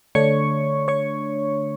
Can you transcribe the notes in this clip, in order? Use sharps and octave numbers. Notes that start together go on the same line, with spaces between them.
D3 A3 D4 C#5 C#6
C#5 C#6